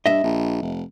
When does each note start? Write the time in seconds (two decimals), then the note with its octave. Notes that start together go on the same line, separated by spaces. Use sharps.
0.06 G2 D#5 E5
0.24 A#1
0.62 F1